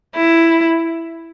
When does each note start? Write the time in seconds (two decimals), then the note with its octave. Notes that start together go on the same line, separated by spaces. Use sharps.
0.15 E4